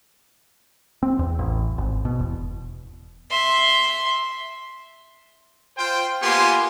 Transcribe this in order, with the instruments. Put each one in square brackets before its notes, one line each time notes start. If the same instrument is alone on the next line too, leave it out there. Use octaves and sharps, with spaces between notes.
[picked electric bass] C4
E2
A1
G#1
B2
E1
[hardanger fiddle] E5 C6
[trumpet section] F4 C5 G5
A#3 B3 F4 G4 G#5 C6